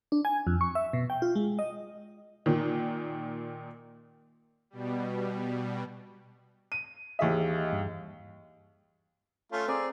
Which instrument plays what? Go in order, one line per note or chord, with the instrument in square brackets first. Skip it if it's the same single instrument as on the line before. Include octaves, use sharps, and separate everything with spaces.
[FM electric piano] D4
G#5
F2
C#6
E5
B2
G5
F4
G#3
D#5
[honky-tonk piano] A#2 D#3
[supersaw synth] B2 G3
[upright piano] D#7
[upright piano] D#2 E5 [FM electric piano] E3 G#4 D#5
[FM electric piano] G2
[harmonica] A3 C#4 F4
[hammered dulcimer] C4 D5 [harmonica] G#4 A#5